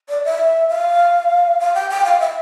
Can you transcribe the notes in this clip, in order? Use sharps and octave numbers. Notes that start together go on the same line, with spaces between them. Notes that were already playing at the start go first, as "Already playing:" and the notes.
D5
E5
F5
F5
G5
G5
F5
E5